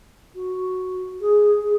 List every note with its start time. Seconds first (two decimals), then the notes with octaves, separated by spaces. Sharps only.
0.35 F#4
1.21 G#4
1.63 G#4